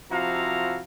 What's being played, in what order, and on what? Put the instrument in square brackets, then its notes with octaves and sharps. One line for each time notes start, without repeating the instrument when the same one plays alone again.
[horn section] C3 F3 E4 F#4 F5 A#5